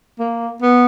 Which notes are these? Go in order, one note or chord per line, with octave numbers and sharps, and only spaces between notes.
A#3
B3